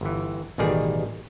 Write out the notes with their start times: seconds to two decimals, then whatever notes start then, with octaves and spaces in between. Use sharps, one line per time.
0.01 G1 E3
0.58 A1 B2 D#3 G3 G#4